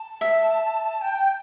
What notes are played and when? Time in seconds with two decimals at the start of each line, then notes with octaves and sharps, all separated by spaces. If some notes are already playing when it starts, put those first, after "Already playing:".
Already playing: A5
0.21 E5
1.02 G5